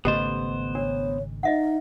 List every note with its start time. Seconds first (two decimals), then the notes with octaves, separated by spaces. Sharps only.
0.05 G#1 C#3 A3 B3 G4 C5 D#5
0.75 D4 C#5
1.43 D#4 D#5 E5 F#5